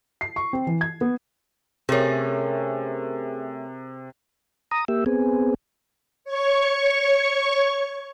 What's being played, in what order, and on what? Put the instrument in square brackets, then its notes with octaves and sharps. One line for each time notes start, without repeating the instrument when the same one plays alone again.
[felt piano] C7
C#6
C4
E3
G#6
B3
[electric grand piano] C3 [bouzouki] A3 C#4 [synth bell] G#4 A#4
[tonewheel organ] A#5 D#6
A#3 G4 E5
B3 C4 G#4
[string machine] C#5 C#6